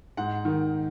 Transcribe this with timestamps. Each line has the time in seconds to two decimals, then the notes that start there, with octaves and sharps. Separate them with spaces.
0.17 G#2 F#5
0.45 D#3